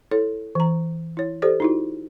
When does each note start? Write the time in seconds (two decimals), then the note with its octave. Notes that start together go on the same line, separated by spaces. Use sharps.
0.11 E4 A4 C#5
0.55 E3 A#5
1.17 E4 C#5
1.42 G4 A4 C5 D5
1.60 D#4 E4 F#4